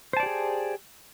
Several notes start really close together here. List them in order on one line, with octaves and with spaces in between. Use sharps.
C5 A5 D5 G4 G#4